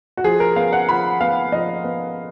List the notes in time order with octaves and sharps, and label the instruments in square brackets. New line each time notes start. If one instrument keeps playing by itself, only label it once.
[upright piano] F#4
F3 G#4
A#4
B3 F5
F#5
F3 B5
B3 F5
F3 D#5
B3